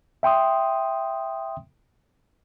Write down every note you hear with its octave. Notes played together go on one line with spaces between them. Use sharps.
E5 G5 C6 D#6